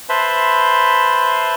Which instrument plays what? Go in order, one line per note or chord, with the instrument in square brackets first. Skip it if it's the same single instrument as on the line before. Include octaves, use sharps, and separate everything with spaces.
[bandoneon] B4 C5 E5 A5 B5 C6